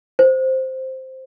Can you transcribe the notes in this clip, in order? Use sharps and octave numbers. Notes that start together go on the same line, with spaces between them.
C5